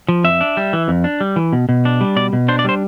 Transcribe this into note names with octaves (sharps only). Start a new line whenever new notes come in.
F3
F2 E5
D4
G3
E3
F2
D4
G3
E3
B2
B2
D4
G3
B2 D5
B2
D4 C5
D5
G3 C5